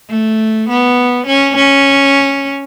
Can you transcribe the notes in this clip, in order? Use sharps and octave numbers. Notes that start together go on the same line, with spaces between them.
A3
B3
C#4
C#4